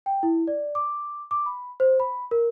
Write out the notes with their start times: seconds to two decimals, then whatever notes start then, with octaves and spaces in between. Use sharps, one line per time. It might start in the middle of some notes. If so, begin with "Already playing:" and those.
0.06 G5
0.23 E4
0.47 D5
0.75 D6
1.31 D6
1.46 B5
1.80 C5
2.00 B5
2.31 A#4